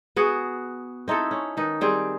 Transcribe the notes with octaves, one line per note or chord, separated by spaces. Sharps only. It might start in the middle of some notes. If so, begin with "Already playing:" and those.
B3 F#4 G#4
C4 D#4 E4 A4
C#4
D#3 D#4 B4
G3 C4 G#4